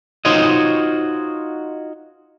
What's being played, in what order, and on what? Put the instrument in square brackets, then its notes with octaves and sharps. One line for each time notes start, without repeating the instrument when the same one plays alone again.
[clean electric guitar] D#4 F4 F#4 C5 C#5 D#5